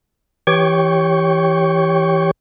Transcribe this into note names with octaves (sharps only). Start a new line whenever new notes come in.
E3 G4 C#5 G5 C#6